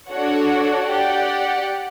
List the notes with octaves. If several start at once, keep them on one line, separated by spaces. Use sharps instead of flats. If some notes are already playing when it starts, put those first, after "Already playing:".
D4 F#4 A4 C#5 F#5
G4 D5 F#5